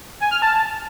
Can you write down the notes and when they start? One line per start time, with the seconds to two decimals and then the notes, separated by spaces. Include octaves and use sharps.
0.20 G#5
0.31 F6
0.42 A5